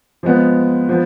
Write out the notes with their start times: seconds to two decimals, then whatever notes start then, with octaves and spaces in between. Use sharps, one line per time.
0.23 F3 G#3 B3
0.89 F3 B3